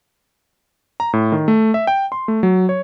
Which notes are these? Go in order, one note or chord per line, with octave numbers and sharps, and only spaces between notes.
A#5
A2
D#3
A3
E5
G5
C6
A3
F#3
C#5